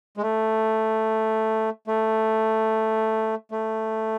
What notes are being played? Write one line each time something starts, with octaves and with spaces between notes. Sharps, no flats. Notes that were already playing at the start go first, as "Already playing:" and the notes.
G#3
A3
A3
A3